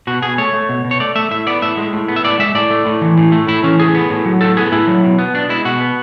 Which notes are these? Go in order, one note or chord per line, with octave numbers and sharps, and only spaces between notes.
B2 F#4
B2 G#4
A3 C#5
A3
B2
B2
C#5
A3 D5
A3 E5
A2 E5
B3 D5
A2 E5
G#3
A2
B3
E5
A2 D5
G#3 E5
A2 D5
A3
A2
E3
A2
A3
A2 E4
E3 C#4
A2 G#4
B3
A2
F#3
A2 A4
B3 G#4
A2 E4
F#3
B2
B3
B2 D4
G#3 E4
B2 F#4
B3